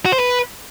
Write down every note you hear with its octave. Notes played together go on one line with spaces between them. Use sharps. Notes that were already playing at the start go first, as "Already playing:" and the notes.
F#4
C5
B4